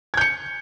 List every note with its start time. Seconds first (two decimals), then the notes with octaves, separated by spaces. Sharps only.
0.14 G#6
0.17 G6
0.21 C#7